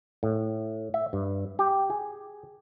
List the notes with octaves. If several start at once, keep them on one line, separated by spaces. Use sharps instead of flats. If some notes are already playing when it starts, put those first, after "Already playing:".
A2
E5
G2
G4
G#4